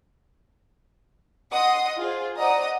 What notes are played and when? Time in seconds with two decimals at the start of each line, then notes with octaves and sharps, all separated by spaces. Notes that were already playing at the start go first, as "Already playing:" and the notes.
1.51 D#5 F#5 C6 D#6
1.98 F4 G#4 C5
2.37 C5 D5 D#5 F#5 A#5 D#6